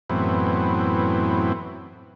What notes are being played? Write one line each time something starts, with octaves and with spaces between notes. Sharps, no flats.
F#2 A2 E3 B3 C4